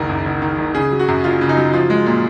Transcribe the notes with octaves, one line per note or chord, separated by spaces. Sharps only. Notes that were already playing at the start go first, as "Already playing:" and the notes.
Already playing: F#1 C#2 D#3 A#4
F#2
F#1
D#3
F#1
C#3 G#4
F#3
F#4
F#2
F#1 F4
C#3
D#4
F#3
F3 F4
G#3
A#2